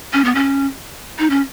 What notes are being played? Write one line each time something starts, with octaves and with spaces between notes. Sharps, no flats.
C#4
B3
C#4
D#4
C#4